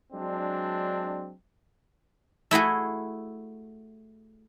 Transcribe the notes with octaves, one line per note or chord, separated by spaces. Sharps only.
F#3 G#3 C4 D4
A3 E4 F#4 G#4